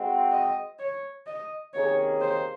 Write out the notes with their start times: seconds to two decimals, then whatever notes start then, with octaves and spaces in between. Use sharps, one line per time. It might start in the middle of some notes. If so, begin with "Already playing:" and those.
Already playing: G#3 C4 F#4
0.32 D#5
0.79 C#5
1.26 D#5
1.74 C3 D#3 A#3 C#4 G#4 C#5
2.21 C5